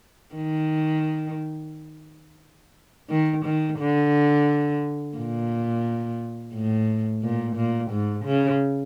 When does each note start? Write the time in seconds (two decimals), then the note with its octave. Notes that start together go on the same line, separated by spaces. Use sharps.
0.35 D#3
3.10 D#3
3.46 D#3
3.80 D3
5.17 A#2
6.55 A2
7.23 A#2
7.56 A#2
7.91 G#2
8.25 C#3